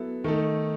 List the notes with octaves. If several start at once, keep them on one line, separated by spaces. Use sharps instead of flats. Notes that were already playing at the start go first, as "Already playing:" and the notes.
Already playing: F#3 B3 E4 A4
D#3 A3 D#4 A4